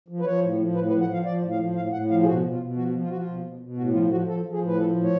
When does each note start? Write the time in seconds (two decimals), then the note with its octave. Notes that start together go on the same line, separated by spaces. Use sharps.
0.08 F3
0.20 B4
0.25 F3 C#5
0.42 A2
0.59 F3
0.75 A2 B4
0.88 B4
0.92 F3
1.01 F#5
1.09 F3 F5
1.25 F3 D5
1.42 A2
1.51 F5
1.59 F3
1.76 A2 F5
1.93 A2 F#5
2.10 F3 F5
2.22 G#4
2.26 B2 F#4
2.43 B2
2.51 F4
2.60 B2
2.76 F3 F#4
2.93 F3
3.02 F4
3.10 F3 F#4
3.17 F4
3.27 B2
3.43 B2
3.60 B2
3.77 A2 F#4
3.93 F3 F4
4.10 F3 F#4
4.27 F3 A4
4.45 F3
4.52 G#4
4.61 A2
4.67 B4
4.78 F3 A4
4.95 A2
5.04 C#5